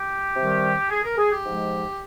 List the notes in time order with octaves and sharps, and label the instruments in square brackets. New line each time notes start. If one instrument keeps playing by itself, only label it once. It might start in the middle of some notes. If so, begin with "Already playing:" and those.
Already playing: [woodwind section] G4
C3 D#3 G3
G#4
A#4
G#4
G4
G#2 F3 G#3